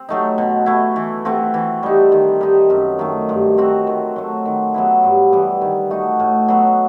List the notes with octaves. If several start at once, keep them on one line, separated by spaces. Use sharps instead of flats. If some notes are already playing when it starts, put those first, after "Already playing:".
Already playing: C4
F#3 A3 D#4
B2
A3 E4
E3
A3 C4 F#4
E3
G3 D#4
D#3
G3 D#4
F#2
D#3 A3
G2
F#3 C4 F#4
D#3
F#3 A3
D#3
F#3 B3 E4
G2
E3 G3 B3
D#3
A3 D#4 F#4
A2
F#3 B3 F#4